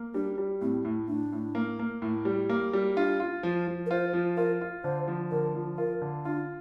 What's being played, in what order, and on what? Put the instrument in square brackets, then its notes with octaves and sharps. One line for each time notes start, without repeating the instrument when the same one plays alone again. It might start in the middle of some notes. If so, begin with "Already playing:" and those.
Already playing: [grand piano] A#3
[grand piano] G3 [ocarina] D4
[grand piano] G3
[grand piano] A2 [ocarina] C4
[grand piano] A2
[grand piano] A2 [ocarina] D4
[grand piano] A2
A#3
A#3
A2
G3
A#3
G3
[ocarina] D4 [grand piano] F4
[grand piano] F4
F3
F3
[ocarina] A#4
[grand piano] F4 [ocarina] C5
[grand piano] F3
[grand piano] F4 [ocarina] A#4
[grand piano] F4
[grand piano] D3 [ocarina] C5
[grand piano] F3
[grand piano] D3 [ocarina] A#4
[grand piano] F3
[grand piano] F4 [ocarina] A#4
[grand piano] D3
[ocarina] D4 [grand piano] F4